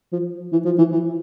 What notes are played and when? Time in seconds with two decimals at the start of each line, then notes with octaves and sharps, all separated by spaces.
0.12 F3
0.52 E3
0.65 F3
0.78 E3
0.92 E3